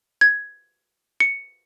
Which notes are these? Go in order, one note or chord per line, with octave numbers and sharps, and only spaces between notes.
G#6
C#7